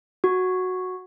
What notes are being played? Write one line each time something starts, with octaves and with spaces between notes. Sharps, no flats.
F#4